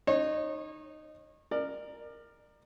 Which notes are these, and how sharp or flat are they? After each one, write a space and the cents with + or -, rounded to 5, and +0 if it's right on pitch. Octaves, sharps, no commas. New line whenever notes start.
D#4 -15 C#5 -35
A#4 +0 D5 +30